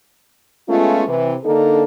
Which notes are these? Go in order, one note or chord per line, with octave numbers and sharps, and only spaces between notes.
G#3 A3 B3 C#4 F4
C3 E3
D3 A#3 D4 D#4 A4